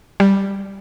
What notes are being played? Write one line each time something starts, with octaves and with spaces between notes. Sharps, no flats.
G3